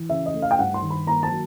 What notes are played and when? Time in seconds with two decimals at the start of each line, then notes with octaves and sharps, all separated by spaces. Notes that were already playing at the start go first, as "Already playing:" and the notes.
Already playing: E3
0.09 C#3 E5
0.26 D#5
0.34 A3
0.42 F5
0.51 G5
0.59 G2 F#5
0.74 C6
0.82 D#3
0.90 B5
1.07 A#3 A#5
1.23 A5
1.31 F#3